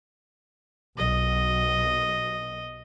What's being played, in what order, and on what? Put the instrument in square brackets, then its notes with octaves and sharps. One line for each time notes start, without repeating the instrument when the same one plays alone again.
[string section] B1 [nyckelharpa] D#5